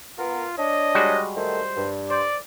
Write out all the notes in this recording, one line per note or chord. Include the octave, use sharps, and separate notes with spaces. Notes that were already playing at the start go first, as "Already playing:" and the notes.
B3 F4 A#4
D4 C#5 D#5
G3 G#3 F#4
D#3 A3 C5
G2
C5 D5